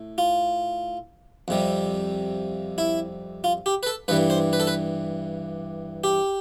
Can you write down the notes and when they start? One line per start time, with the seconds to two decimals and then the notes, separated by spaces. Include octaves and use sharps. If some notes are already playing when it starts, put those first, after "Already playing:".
Already playing: A2
0.18 F4
1.48 F2 C3 G3
2.78 E4
3.44 F4
3.66 G4
3.83 B4
3.87 A4
4.08 G2 E3 G3 B4
4.30 C5
4.53 B4
4.60 A4
4.67 B4
6.04 G4